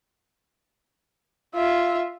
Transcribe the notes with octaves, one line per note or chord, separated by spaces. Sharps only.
F4 E5